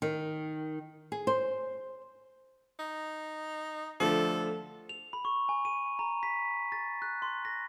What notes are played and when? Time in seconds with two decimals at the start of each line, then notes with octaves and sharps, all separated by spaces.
0.02 D#3
1.12 G#4
1.27 C5
2.79 D#4
4.00 D3 F3 A3 A4
4.89 F7
5.13 B5
5.25 C#6
5.49 G#5
5.65 D#7
5.99 A#5
6.23 B6
6.72 A6
7.02 F#6
7.22 C6
7.45 A#6